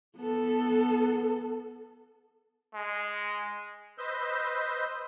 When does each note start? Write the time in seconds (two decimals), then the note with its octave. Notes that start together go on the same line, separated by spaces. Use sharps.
0.17 B3 A4
2.74 G#3
3.98 B4 C5 D#5 E6 G6